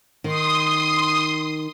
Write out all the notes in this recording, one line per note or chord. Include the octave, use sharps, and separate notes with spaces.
D#3 C6 D#6